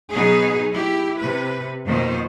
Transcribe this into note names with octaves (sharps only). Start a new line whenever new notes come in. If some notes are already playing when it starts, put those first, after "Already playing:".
B2 F#3 B3 D#4 G#4
E4 G4
C3 B4
F2 B2 D#3 F3 A#3 C5